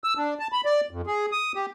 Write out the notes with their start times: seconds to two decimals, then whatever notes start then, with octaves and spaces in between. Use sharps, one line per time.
0.04 E6
0.17 D4
0.39 A5
0.52 B5
0.65 D5
0.91 F2
1.07 G#4
1.32 D#6
1.55 G4